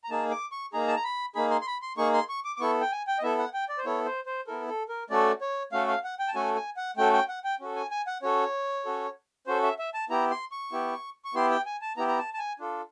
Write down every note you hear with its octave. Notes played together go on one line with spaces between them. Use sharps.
A#5
A#3 D#4 G#4 A5
D6
C#6
A#3 D#4 G#4 A#5
A5
A#5
B5
A#3 D#4 G#4 B5
C6
C6
B5
C6
A#3 D#4 G#4 C#6
C6
C#6
D6
D6
B3 E4 A4 C#6
G5
G#5
G5
D#5
B3 E4 A4 E5
F#5
G5
D5
C5
B3 E4 A4 C#5
C5
C5
B3 E4 A4 A#4
A4
A#4
A3 C#4 F#4 A4 D5
C#5
A3 C#4 F#4 A4 F5
F5
F#5
G5
A5
A3 C#4 F#4 A4 G#5
G#5
F#5
A3 C#4 F#4 A4 G5
G5
F#5
G5
C#4 F#4 A4
G#5
G#5
F#5
C#4 F#4 A4 C#5
C#4 F#4 A4
C#4 F#4 A4 C5
E5
E5
A5
B3 E4 G4 A#5
C6
C#6
B3 E4 G4
C#6
B3 E4 G4 C6
G5
G#5
A5
B3 E4 G4 A#5
A#5
A5
A5
G#5
D4 F4 A4